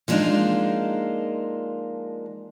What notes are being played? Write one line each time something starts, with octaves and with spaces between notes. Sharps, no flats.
F3 G#3 A#3 D4 D#4 F4